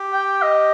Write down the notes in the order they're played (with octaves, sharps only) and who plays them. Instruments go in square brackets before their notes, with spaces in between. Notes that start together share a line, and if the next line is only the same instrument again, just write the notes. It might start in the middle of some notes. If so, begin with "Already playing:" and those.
Already playing: [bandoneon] G4
[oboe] G5
D#5